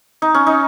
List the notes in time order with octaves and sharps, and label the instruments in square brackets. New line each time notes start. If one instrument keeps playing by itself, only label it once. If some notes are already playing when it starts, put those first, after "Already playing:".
[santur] D#4
C#4
D#4